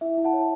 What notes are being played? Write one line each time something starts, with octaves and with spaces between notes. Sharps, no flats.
E4 E5
E4
F#5 A5
C#5